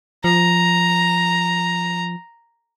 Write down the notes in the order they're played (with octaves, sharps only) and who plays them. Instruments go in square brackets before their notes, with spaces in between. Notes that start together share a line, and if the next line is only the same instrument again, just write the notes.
[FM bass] F3 [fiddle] A#5